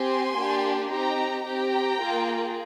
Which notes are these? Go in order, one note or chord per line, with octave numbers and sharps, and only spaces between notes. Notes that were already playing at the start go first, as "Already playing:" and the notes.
Already playing: C4 G4 G#5 C6
A#3 D4 G4
C4 D#4 G4 G5 A#5
C4 G4 G5 A#5
A#3 F4 G#4